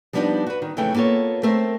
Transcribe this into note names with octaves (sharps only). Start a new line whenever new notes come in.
F3 G3 B3 C4 D4 D#4
F#4 B4
D#3
F2 C#3 E3 A3 G5
A#3 B3 F4 A4 C#5
A3 C4 A#4 C5 E5